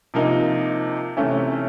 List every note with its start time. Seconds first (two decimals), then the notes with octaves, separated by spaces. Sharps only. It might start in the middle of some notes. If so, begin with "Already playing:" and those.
0.14 C3 F3 A#3 D#4
1.17 C3 E3 A3 C#4 E4